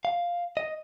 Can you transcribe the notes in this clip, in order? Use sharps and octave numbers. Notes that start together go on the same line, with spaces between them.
F5
D#5